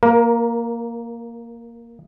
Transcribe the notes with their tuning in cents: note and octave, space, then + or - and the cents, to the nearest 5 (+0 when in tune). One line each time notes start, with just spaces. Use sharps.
A#3 +0 A#4 +25